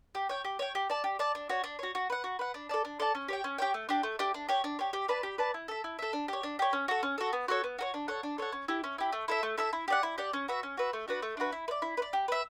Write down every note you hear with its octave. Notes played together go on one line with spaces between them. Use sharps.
G4
C#5 G5
G4
C#5 G5
G4
D5 A5
G4
D5 A5
D4
F#4 C#5
D4
F#4 C#5
F#4
B4 F#5
F#4
B4 F#5
D4
A4 D5 A5
D4
A4 D5 A5
C#4
G4 C#5 G5
C#4
G4 C#5 G5
A3
D4 G4
A3
D4 G4
D4
G4 C#5
D4
G4 C#5
G4
B4 D5 A5
G4
B4 D5 A5
E4
A4 E5
E4
A4 E5
D4
G4 C#5
D4
G4 C#5
C#4
F#4 A4
C#4
F#4 A4
B3
F#4 A4 C#5
B3
F#4 A4 C#5
D4
A4 C#5 F#5
D4
A4 C#5 F#5
C#4
E4 G4
C#4
E4 G4
A3
E4 A4 E5
A3
E4 A4 E5
E4
G4 D5 F#5
E4
G4 D5 F#5
C#4
F#4 B4 E5
C#4
F#4 B4 E5
A3
D4 F#4 B4
A3
D4 F#4 B4
E4
B4
D5
E4
B4
D5
G4
B4 E5